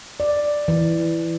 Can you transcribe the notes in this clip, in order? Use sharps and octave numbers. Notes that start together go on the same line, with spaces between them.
D5
E3